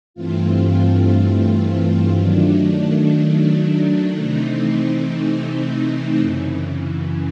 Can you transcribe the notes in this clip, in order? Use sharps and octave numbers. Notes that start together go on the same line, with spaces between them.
G2 E3 A3 C4 F4
D#3 F#3 A3 D4
C3 E3 A3 C4 D#4
F#2 C#3 E3